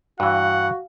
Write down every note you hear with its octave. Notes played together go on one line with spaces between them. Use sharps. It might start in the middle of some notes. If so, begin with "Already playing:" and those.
G2 E3 F#4 F5 F#5